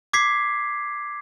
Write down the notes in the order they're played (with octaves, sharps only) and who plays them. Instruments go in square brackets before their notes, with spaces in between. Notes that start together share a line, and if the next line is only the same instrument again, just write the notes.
[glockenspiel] D6 G#6 B6 C7